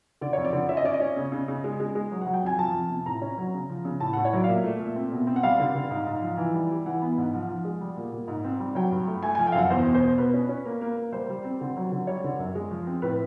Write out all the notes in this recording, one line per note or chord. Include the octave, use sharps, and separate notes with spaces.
D3 D5
F2 C#5
D5
D3
C#4 E5
D#5
C#4 D5
D#5
C#4
C#3
C#3
C#3
G#3
G#3
G#3
F#3
F#5
F#3
G5
F2 G#5
F3 A5
F2
C3
A2 A#5
C#4
F#3
C#3
F3
C#3
A2 A5
F#5
A2
C#5
F#3 D5
F5
A#2 E5
A3
A#2
C4
B2
C4
F#5
G3 F5
D3
D3
G#2
G#2
F3
E3
G3
G3
E3 F#5
B3
G#2
F3
F3
G#3
G3
A#2
A#2
G#2
C4
G3
F#3 G5
G2
A3
A3 G#5
G#5
F3
G5
F5
F#2 F#5
E2 C5
B2
C5
B2
B2 B4
C#4
C#4
A#3
A#3
A#3
G3 C5
G3
C4
D3
F#3
D3
G3 C#5
D3
F#2
G#3
F3
C4
A2 B4